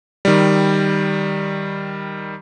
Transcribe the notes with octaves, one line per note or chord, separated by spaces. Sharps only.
D#3 G3